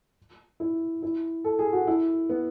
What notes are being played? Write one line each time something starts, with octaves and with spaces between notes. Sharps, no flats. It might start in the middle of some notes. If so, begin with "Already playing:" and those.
E4
E4
A4
G#4
F#4
E4
B3